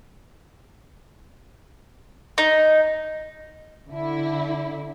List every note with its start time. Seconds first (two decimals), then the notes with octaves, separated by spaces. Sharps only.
2.38 D#4
3.89 D3 E4